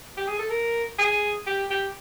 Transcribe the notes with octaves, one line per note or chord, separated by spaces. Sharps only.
G4
G#4
A4
A#4
G#4
G4
G4